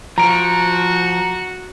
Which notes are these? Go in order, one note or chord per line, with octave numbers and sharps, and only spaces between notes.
F3 F#4 A#5 D7